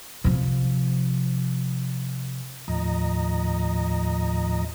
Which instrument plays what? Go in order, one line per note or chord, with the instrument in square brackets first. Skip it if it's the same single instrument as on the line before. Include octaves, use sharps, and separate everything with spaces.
[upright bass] C3 F3
[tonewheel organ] D#2 A2 F3 D#5 A#5